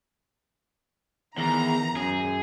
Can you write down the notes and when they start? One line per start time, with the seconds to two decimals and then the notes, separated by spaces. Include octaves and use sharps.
1.38 E2 D#3 A#5
1.96 F#2 G#4